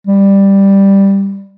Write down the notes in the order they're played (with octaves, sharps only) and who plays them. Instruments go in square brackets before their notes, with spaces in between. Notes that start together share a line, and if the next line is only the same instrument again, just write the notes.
[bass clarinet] G3